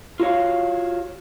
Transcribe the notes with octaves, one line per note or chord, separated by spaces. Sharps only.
F4 F#4 C#5 F5